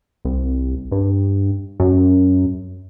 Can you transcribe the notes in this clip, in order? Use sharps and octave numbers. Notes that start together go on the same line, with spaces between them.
C2
G2
F#2